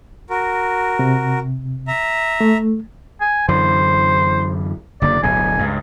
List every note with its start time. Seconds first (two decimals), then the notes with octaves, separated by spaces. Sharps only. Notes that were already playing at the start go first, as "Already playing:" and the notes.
0.30 F#4 A#4
0.99 C3
1.88 E5 A#5
2.41 A3
3.21 G#5
3.49 F#2 D3 E3 C5
5.02 F#1 D3 A#3 D5
5.23 D1 B1 B2 G#5
5.59 C#2 G2